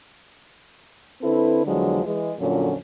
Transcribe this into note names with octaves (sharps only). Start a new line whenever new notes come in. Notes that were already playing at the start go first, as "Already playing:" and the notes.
D3 C4 E4 A4 B4
E2 D3 F3 F#3 G#3
E3 G#3
F2 A#2 D3 F#3 C#4